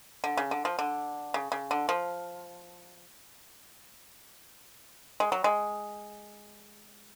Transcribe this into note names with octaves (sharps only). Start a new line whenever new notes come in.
D3
C#3
D3
F3
D3
C#3
C#3
D3
F3
G#3
F#3
G#3